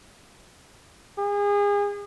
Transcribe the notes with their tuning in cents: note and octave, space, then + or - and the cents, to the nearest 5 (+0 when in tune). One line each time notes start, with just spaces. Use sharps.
G#4 -35